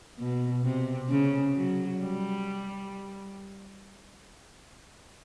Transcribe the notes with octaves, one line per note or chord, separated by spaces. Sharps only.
B2
C3
C#3
F#3
G3